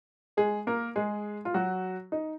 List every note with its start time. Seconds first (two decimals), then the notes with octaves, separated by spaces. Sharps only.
0.37 G#3 G#4
0.67 A#3 A#4
0.96 G#3 G#4
1.45 F4
1.54 F#3 F#4
2.12 D#4